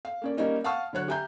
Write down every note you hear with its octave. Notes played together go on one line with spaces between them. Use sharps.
F5
A#3 C#4 D5
G3 A#3 C#4 D#4 A#4
F5 F#5 A5 C#6 D#6 F6
D3 F#3 C#5 F#6
G4 E5 G#5 A#5 G6